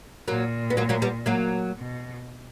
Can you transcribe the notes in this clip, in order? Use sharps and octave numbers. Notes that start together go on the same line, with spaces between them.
A#2 F#3 A#3
B3
F#3 A#3
F#3 A#3
G3 B3
F#3 A#3
B2